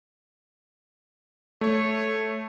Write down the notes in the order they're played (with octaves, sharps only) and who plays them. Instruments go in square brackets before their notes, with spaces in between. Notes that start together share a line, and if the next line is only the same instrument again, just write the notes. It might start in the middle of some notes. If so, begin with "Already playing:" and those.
[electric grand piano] A3 [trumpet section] C#5